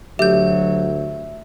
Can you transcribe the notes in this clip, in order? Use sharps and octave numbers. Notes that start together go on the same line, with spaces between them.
D2 F#3 G4 E5 G6